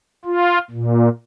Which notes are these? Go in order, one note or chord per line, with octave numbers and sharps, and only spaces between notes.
F4
A#2